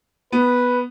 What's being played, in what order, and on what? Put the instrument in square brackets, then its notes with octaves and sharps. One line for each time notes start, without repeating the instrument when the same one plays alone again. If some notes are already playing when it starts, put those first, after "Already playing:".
[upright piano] B3 [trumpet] B4